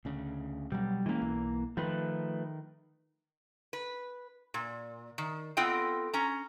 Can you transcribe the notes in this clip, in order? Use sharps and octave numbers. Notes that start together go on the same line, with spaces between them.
D2 C#3
B2 F#3 G3
E3 G#3 A#3 C#4
B1
D#3 F3 A3 B4
B4
A#2
D#3
B3 C4 F4 A4 D#5 G5
C#4 A#5